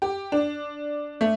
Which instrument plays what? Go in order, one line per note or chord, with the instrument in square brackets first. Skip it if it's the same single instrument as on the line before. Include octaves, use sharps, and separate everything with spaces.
[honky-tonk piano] G4
D4
A3